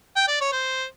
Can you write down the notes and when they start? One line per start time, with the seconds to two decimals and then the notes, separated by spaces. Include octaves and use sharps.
0.17 G5
0.28 D5
0.41 C#5
0.53 C5